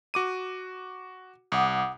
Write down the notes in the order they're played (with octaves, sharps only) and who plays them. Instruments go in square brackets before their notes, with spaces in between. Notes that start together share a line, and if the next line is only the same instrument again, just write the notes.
[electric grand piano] F#4 D6 D#7
[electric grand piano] C2 [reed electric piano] F#5 D6 D#6